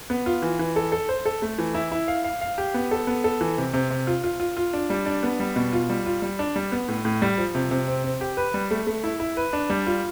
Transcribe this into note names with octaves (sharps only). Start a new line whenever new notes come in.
B3
F4
E3
E3
A4
A4
C5
A4
A3
E3
E4
E4
F5
F5
F5
G4
B3
A4
B3
A4
E3
C3
C3
C3
F4
F4
F4
F4
D4
G3
D4
B3
G3
B2
F4
G3
F4
G3
D4
G3
B3
A2
A2
G3
F3
C3
C3
C4
C4
G4
B4
G3
A3
A3
E4
E4
B4
D4
G3
F4